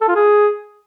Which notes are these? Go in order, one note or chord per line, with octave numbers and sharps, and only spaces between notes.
A4
F4
G#4